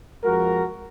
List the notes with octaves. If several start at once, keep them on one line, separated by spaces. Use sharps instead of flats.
F2 F3 G#3 F#4 A#4